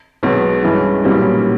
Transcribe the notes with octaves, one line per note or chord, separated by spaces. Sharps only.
B1 B2 G#3 B3
G2 E3 G#3 C#4 E4
B1 A#2 G3 C#4 E4